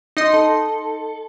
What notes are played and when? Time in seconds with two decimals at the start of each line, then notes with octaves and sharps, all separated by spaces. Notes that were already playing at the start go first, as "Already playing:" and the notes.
0.17 D#4 D#5 C6
0.33 A4